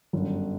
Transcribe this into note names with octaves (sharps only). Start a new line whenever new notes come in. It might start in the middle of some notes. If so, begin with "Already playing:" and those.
G1 F#2 F#3